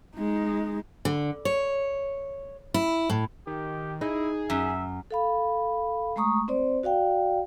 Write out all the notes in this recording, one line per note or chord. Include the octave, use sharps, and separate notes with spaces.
G#3 D#4
D3
C#5
E4
A2
D#3 G4
D#4 E4 G#4
F#2 E5
A4 F5 B5
G#3 A3 A#5 C#6 D#6
C4 C5 D5
F#4 D5 F5 G5